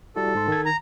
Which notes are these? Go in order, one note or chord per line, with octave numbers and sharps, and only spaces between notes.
G3 E4 F#4 A4
G#2 C6
D#3 G#6
A#5